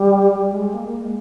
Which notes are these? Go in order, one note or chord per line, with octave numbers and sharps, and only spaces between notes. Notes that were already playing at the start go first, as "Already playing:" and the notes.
Already playing: G3
G3
G#3
A#3
A#3
G#3